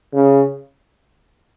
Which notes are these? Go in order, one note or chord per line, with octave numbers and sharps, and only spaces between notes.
C#3